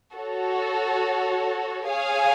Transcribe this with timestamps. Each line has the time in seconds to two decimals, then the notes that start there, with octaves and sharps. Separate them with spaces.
0.14 F#4 A4 C#5
1.88 G#4 C#5 F5 G#5